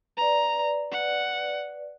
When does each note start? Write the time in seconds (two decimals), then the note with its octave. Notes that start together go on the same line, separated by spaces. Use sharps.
0.17 B4 D5 A#5
0.92 F#5